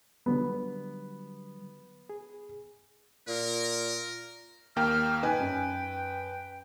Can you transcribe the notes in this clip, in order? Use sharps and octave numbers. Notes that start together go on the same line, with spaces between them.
D3 F#3 G3 B3
G#4
A#2 A#4
D#2 A#3 G5 F6
D#4 B4 G5 G#5
F#2